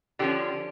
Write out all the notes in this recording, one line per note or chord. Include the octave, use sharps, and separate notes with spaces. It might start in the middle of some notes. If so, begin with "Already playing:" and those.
D3 F3 C#4 G4